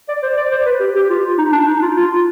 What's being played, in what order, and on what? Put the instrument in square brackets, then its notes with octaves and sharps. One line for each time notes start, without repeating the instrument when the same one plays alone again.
[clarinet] D5
C5
D5
C5
B4
G4
G4
F4
D#4
D4
D#4
F4
F4